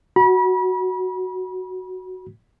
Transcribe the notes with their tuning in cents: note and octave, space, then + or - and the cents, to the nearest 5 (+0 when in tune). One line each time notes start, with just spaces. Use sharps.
F#4 +0 B5 -35